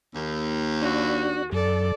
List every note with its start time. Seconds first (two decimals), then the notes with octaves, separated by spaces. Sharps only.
0.15 D#2
0.82 D4 F#4
1.52 F#2 A4 D5